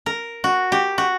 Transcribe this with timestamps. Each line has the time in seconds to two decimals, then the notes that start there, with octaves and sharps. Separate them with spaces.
0.06 A#4
0.44 F#4
0.72 G4
0.98 F#4